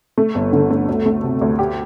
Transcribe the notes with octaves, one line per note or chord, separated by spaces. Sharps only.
A3
G1
D3
A3
D2
A3
C3
D2
G4